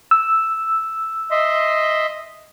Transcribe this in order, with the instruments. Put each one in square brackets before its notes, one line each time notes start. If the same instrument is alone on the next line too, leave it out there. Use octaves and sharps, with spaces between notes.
[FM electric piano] E6
[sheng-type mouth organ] D#5 E5 C6